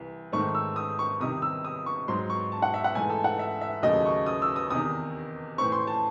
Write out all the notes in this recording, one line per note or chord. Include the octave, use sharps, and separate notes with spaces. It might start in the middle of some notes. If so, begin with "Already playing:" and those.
Already playing: C2 E3
G#2 D#3 A3 C4 C#6
E6
D#6
C#6
C2 C3 D#3 D#6
E6
D#6
C#6
G#2 F#3 C4 C6
C#6
A5
F#5
E5
F#5
G#2 E3 A3 G#5
A4
F#5
E5
E5
D#2 C#3 F#3 A3 D#5
C#6
D#6
E6
D#6
E2 C3 D#3 D#6
A2 E3 C4 C#6
C6
A5